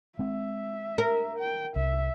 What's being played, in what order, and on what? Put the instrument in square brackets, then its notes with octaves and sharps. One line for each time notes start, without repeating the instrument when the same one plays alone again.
[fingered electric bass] G#3 C4 [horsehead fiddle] E5
[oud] A#4
[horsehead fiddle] G5
[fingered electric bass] C2 [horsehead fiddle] E5